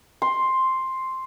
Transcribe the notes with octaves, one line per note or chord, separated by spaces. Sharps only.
C6